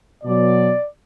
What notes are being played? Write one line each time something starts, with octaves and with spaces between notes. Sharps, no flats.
B2 F#3 D5